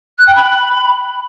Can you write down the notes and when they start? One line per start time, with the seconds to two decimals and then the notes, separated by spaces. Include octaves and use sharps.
0.18 F#6
0.27 G5
0.35 B5